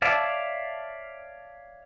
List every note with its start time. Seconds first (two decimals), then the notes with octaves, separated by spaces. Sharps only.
0.02 C#5 D5 E5 F5 A5